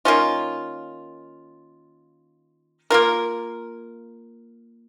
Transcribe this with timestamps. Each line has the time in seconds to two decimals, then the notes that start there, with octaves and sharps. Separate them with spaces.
0.05 D#3 A#3 C#4 F4
2.90 A#3 F4 A#4